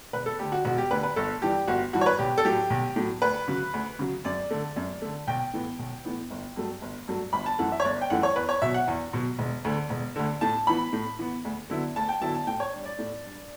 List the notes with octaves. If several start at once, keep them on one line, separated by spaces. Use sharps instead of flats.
E1 B4
A4
D2 D3 G4
F#4
E1 F#4
G4
D2 D3 B4
B4
G1 A4
G2 E3 G3 G4
G1 F#4
G2 E3 G3 F#4
C#5
B4
B1 G4
A4
A2 F#3 G4
B1
A2 F#3
D2 B4
C#3 F#3
D2
C#3 F#3
F#2 D5
D3 A3
F#2
D3 A3
B1 G5
A2 E3 B3
B1
A2 E3 B3
G1
G2 F#3 A3
G1
G2 F#3 A3
G1 B5
A5
F#2 E3 A3 F#5
E5
C#5
G1 D5
G5
F#2 E3 A3 F#5
C#5
E2 B4
C#5
B2 F#3 E5
F#5
E2
B2 F#3
E1
D2 D3
E1
D2 D3
A2 A5
E3 B3 B5
A2
E3 B3
D2
D3 F#3 B3 E4
D2 A5
G5
D3 F#3 B3 E4 A5
A5
A2 G5
C#5
G3 D4
D5
A2
G3 D4